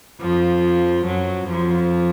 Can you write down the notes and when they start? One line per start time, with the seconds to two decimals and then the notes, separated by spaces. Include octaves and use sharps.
0.21 F2 F3
1.06 F#2 F#3
1.48 F2 F3